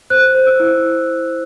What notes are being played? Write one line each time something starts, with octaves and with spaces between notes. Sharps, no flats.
C5 F#6
C5
E6
E4